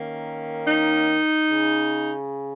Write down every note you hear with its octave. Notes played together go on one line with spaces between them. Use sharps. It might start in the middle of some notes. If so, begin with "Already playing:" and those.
Already playing: D#3 A#3 C#4
D#4
C#3